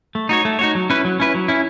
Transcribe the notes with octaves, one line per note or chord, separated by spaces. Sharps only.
A3
D#4 F#4 C#5
A3
D#4 F#4 C#5
F#3
C#4 E4 B4
F#3
C#4 E4 B4
F#3
C#4 E4